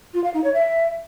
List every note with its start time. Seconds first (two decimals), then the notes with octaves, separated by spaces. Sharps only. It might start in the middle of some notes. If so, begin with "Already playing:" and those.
0.14 F4
0.24 F5
0.34 D#4
0.44 C#5
0.54 E5